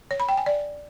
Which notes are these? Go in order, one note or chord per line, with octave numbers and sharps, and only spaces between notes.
C#5
B5
G5
G#5
D5